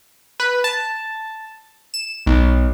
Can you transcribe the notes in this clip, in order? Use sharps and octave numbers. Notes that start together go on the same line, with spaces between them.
B4
A5
E7
B1